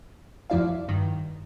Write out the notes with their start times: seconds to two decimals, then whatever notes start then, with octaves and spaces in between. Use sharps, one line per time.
0.50 F2 F3 F#3 E4 D5 F5
0.88 G2 D#3